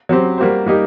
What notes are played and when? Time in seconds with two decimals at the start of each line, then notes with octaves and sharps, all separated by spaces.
0.09 F#3 C4 G4 C5
0.38 G3 A#3 F#4 C5
0.66 G3 A#3 D#4 G4